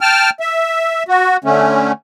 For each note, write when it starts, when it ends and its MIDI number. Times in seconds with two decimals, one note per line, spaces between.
0.01 0.30 79
0.01 0.30 81
0.01 0.30 89
0.40 1.03 76
1.08 1.37 66
1.44 1.92 50
1.44 1.92 57
1.44 1.92 61